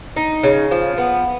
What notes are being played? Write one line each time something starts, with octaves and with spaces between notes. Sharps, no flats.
D#4
C#3
F3
B3